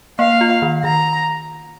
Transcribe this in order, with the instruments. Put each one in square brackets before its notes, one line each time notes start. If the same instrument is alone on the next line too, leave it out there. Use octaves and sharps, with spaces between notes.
[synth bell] A#3 [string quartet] F5
[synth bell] F4
D#3
[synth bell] D#3 [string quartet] A#5